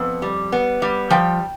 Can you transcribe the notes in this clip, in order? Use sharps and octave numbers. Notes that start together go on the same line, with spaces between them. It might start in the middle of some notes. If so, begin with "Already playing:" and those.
Already playing: F2 B3
G3
B3
G3
F3 G5